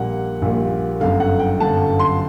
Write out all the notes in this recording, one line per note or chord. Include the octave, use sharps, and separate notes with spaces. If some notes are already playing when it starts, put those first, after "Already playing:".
Already playing: A#1 A#2 G3 A#3 F#5
A#1 A#2 G3 A#3
G1 F#2 D3 F5
F#5
G5
G1 F#2 D3 A5
C6